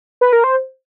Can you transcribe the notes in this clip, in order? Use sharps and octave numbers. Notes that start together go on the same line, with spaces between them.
B4
A#4
C5